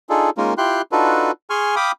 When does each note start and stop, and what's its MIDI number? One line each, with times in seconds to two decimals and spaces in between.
0.10 0.30 62
0.10 0.30 63
0.10 0.30 65
0.10 0.30 68
0.10 0.30 69
0.37 0.54 56
0.37 0.54 58
0.37 0.54 61
0.37 0.54 63
0.37 0.54 65
0.37 0.54 70
0.58 0.82 64
0.58 0.82 65
0.58 0.82 67
0.58 0.82 79
0.58 0.82 84
0.58 0.82 90
0.92 1.31 62
0.92 1.31 63
0.92 1.31 65
0.92 1.31 66
0.92 1.31 69
0.92 1.31 71
1.50 1.75 68
1.50 1.75 80
1.50 1.75 84
1.50 1.75 85
1.50 1.75 89
1.76 1.92 77
1.76 1.92 79
1.76 1.92 83
1.76 1.92 86
1.76 1.92 87